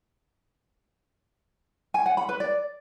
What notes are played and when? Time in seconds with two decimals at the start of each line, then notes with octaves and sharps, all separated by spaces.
1.94 G#5
2.06 F#5
2.17 B5
2.29 B4
2.40 D5